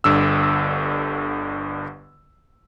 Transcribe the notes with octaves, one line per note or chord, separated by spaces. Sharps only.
G1 G2 D3 E6